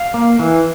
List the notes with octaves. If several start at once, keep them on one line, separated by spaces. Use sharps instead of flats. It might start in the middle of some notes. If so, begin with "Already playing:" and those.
Already playing: F5
A#3
E3